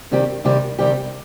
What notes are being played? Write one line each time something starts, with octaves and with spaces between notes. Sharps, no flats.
C3 D#3 G3 C4 G4
C3 D#3 G3 C4 G4
C3 D#3 G3 C4 G4